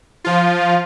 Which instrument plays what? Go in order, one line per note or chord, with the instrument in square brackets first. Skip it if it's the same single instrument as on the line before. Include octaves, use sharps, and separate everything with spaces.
[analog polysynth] F3 F4